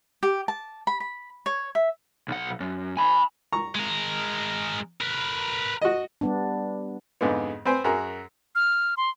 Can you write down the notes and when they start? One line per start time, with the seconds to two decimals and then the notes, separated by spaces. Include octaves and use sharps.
0.23 G4
0.48 A5
0.87 B5
1.00 B5
1.46 C#5
1.75 E5
2.28 B1 F#5
2.60 F#2
2.97 G#5 B5
3.52 A#5 C#6
3.75 G#3 A#4
5.01 A#4 B4
5.82 F#4 D#5
6.21 G3 B3 D4
7.21 F2 G#2 D3 G#3 B3
7.66 C4 B4 C5 G#5
7.84 F#2 F#4 G#4 A#4 A#5
8.55 F6
8.97 C6